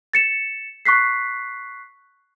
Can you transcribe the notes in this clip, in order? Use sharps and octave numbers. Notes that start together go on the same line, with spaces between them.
A6 C#7 E7
C#6 F#6 B6 C7